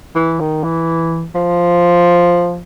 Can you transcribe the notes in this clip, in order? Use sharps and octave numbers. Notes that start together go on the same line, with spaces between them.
E3
D#3
E3
F3